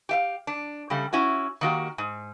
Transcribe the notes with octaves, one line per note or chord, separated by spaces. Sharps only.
G4 E5 F5
D4
C#3 G3 A3
C#4 E4 F#4
D#3 A#3 F#4 G4
G#2